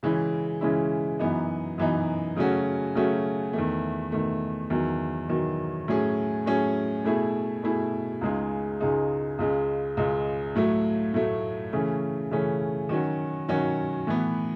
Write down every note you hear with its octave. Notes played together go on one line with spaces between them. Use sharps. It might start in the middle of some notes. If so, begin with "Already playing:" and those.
C#3 E3 G#3 C#4 E4
C#3 E3 G#3 C#4 E4
F#2 E3 B3 D#4
F#2 E3 B3 D#4
C#3 F#3 A3 C#4 F#4
C#3 F#3 A3 C#4 F#4
E2 D#3 A3
E2 D#3 A3
E2 D#3 F#3
E2 D#3 F#3
A2 F#3 C#4 G#4
A2 F#3 C#4 G#4
B2 A3 E4 G#4
B2 A3 E4 G#4
C#2 C#3 G#3 D#4 G#4
C#2 C#3 G#3 D#4 G#4
C#2 C#3 G#3
C#2 C#3 G#3
A2 F#3 A3
A2 F#3 A3
C#3 E3 A3 C#4
C#3 E3 A3 C#4
D#3 F#3 C#4 F#4
D#3 F#3 C#4 F#4
A2 E3 B3